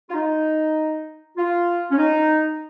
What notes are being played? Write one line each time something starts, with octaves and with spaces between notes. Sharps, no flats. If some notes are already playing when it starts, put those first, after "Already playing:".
F4
D#4
F4
C#4
D#4